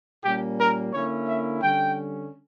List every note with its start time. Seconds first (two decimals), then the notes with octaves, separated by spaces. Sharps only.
0.24 A#2 G3 A#3 C#4 G4
0.59 A#4
0.93 D3 A#3 C#4 E4 C#5
1.28 E5
1.62 D3 G3 C#4 G5